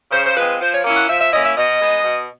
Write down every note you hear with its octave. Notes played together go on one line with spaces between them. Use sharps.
C#3 C5
C5
F3 G#3 C4 B4
F3 C5
C#5
A#3 C#4 E4
F#5
F3 E5
E5
A#3 C#4 E4 D#5
E5
B2 D#5
G#3 B3 D#4
B2